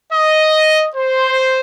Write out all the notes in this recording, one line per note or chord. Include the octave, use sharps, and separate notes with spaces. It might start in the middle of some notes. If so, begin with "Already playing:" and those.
D#5
C5